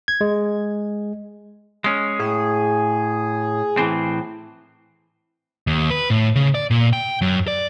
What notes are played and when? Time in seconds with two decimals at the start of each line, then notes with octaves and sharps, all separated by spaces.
0.08 G#6
0.21 G#3
1.84 G#3 C#4
2.19 A2 G#4
3.77 A2 E3 C4
5.67 D#2
5.90 B4
6.10 A2
6.36 C#3
6.55 D5
6.71 A#2
6.93 G5
7.22 F#2
7.48 D5